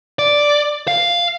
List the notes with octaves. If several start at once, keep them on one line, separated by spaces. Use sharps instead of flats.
D5
F5